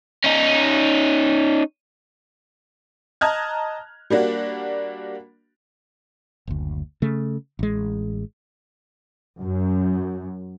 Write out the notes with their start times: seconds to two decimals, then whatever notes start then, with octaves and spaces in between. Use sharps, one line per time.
0.24 C#4 D#4
3.21 D#5 A5 A#5 F6 F#6 G#6
4.10 G3 A#3 D4 F#4
6.47 F#1 D2
7.02 C#3 A3
7.59 A1 G#3
9.42 F#2